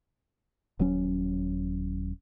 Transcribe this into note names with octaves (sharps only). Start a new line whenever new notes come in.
D#1 F#3 C#4